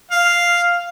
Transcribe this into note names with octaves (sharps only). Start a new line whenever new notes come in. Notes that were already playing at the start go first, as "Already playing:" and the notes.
F5